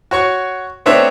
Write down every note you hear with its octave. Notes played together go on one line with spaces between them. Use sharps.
F#4 C#5 C#6
A3 B3 C4 D4 C#5 E5